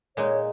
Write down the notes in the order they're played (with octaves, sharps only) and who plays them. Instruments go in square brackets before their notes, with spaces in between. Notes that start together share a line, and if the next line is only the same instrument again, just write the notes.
[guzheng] A#2 G#3 D#4 [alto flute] C#5